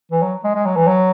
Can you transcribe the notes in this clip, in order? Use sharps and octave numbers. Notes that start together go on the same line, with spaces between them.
E3
F#3
G#3
G#3
F#3
E3
F#3